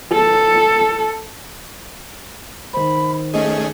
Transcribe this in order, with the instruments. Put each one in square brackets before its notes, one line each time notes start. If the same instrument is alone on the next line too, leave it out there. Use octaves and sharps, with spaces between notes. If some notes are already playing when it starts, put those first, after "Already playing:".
[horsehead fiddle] A4
[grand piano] D#3 C5 [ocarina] B5
[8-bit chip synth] A3 C#4 G#4 [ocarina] D#5